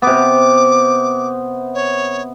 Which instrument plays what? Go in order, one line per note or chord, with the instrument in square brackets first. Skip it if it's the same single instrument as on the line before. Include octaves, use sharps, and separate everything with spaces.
[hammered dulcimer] C3 B3 [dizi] D6
[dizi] C#5